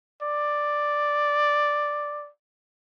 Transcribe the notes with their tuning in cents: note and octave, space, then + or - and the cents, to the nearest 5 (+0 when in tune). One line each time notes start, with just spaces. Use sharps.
D5 +5